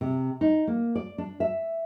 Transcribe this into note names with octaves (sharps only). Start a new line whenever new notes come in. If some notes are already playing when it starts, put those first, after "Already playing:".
C3
D#4
A#3
D5
D4
E5